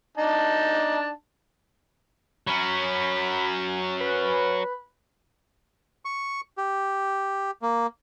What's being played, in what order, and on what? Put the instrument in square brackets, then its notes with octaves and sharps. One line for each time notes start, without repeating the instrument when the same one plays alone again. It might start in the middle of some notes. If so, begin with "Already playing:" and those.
[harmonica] D4 D#4 A5
[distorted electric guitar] F#3 C#4 [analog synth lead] B5
[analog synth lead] B4
[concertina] C#6
G4
A#3